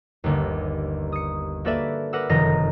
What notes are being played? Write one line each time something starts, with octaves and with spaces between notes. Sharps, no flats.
G1 D#2
D#6 C#7
A#3 F#4 A4 B4 D5 E5
A#4 B4 F#5 D6 E6
F1 F#2 D#3 D#5 A#5 A#6